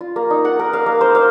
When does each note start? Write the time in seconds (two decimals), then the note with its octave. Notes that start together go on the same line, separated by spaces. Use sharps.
0.01 F4
0.16 A#3
0.30 D#4
0.45 F#5
0.59 A#4
0.73 F5
0.86 A#3
1.01 C5
1.15 F5